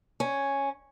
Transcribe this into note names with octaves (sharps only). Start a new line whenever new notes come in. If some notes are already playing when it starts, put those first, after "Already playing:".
C#4